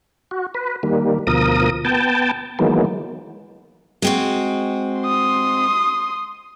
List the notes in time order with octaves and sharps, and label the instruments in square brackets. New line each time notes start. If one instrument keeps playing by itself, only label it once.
[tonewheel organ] F#4
B4
D#3 G3 A#3
D2 B2 F3 A#4 D#6
B3 G5 A5
D#3 E3 F#3 G#3 A#3 B3
[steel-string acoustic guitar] G#3 C4 F#4
[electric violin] C6 D#6